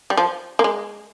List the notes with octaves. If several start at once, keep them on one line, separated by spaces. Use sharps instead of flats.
G3
F3
A#3
G#3